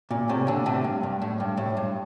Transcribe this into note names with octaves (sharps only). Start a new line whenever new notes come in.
A#2
A2 C3
A#2 D3
A2 C3
G2
G2
A2
G2
A2
G2